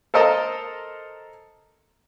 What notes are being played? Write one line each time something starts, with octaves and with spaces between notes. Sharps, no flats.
A4 A#4 C5 D#5 A5 A#5